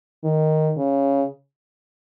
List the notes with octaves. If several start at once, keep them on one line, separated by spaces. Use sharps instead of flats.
D#3
C#3